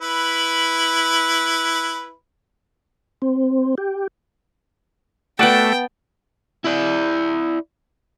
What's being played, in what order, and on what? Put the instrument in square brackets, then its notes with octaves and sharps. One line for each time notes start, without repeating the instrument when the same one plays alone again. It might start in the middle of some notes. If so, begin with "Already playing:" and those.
[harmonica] E4 B4
[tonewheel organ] C4
G4
[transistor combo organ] A3 [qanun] B3 A5 [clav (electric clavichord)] F#4 D5 F#5 [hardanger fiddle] G5
[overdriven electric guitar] E4 D5